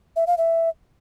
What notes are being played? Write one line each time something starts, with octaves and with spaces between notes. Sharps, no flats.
E5
F5
E5